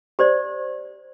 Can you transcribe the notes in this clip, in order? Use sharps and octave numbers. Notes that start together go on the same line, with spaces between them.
G4 C5 D5